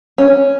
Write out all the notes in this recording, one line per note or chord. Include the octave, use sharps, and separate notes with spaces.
C#4